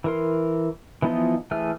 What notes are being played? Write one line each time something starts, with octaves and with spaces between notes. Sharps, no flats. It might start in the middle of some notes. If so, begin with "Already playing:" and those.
E3 A#4 C6
E3 F3 B3 D#4 F4
E3 A3 G#4 F6